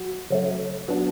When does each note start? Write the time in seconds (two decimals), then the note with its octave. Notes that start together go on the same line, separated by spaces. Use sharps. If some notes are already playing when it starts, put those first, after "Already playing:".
Already playing: F#3 F#4
0.30 C#3 F#3 A3
0.88 F#3 B3 D4 F#4